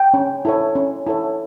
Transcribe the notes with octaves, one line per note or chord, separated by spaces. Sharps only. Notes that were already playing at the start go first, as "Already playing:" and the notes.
Already playing: G5
C#4
E4 A4 C#5
C#4
E4 A4 C#5